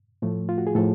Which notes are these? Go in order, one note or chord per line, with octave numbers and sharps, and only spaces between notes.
A2 F3 A3
F4
F#4
G#4
A2 F3 A4